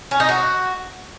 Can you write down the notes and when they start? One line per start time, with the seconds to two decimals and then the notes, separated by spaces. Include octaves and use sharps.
0.11 C#4
0.20 D#4
0.29 F#4